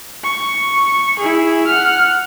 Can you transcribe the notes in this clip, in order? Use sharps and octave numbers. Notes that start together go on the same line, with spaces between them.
C#6
E4 G#4
F#5 F6